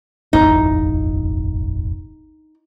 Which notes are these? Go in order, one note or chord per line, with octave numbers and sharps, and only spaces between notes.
D#1 G#1 F2 D#4